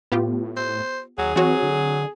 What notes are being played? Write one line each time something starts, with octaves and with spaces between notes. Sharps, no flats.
A2 B3 F4 G4
C5
D#2 F#3 G#4
E3 F#3 C4 F#4 C#5
D3